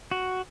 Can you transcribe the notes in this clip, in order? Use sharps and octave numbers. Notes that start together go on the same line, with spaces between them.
F#4